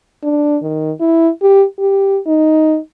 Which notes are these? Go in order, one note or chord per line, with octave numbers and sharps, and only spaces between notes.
D4
D#3
E4
G4
G4
D#4